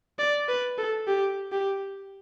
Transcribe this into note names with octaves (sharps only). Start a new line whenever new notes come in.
D5
B4
A4
G4
G4